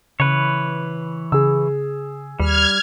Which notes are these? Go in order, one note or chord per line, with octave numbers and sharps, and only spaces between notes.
C#3 E3 B4 C#5
C#3 G#4 E6
D#2 G3 F6 G#6